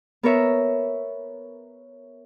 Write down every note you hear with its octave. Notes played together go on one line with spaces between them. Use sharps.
B3 A#4 B4 C#5 E5